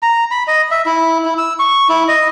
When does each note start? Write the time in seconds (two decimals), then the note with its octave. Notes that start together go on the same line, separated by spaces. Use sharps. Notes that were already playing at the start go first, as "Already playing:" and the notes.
0.03 A#5
0.31 B5
0.47 D#5
0.71 E5
0.86 E4
1.25 E4
1.38 E6
1.59 C#6
1.89 E4
2.08 D#5